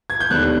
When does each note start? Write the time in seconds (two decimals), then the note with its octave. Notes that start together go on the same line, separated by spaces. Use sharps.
0.10 G#6
0.20 G6
0.30 E1 D#2 D3 G3 B3 F#6